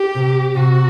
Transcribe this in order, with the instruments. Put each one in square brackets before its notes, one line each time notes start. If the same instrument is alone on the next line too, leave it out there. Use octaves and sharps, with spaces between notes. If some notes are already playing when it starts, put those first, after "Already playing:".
Already playing: [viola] G4
[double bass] C3
[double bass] C3 [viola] F#4